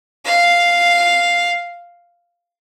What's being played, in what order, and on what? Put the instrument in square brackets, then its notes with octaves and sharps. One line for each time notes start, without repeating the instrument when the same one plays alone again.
[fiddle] F5